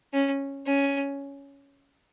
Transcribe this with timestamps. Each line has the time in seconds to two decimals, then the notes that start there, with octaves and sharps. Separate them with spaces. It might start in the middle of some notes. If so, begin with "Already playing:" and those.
0.13 C#4
0.66 C#4